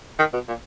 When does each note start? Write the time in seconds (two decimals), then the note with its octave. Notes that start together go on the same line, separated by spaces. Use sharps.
0.19 D#3
0.33 B2
0.48 A#2